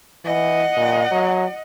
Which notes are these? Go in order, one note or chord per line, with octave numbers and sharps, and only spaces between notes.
E3 D#5 F#5
A#2
F#3